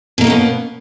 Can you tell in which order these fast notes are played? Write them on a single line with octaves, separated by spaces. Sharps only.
B2 A#3 D#4 C#4 B3